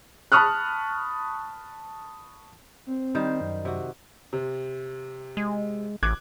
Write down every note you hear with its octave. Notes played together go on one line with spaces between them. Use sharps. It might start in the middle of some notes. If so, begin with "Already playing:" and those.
A5 B5 C#6 D#6 F6 F#6
C4
D#3 G3 C5
F#2
C3 F#4
C3
G#3
A1 D6 F#6 G#6